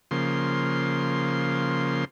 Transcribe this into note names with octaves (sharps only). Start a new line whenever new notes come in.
C#3 F3 A#3 C6